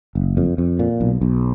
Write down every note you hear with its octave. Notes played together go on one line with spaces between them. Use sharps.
F#1
F2
F2
A#2
B1
B1